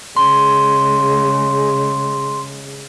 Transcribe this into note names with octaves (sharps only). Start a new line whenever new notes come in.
C#3 G#3 C6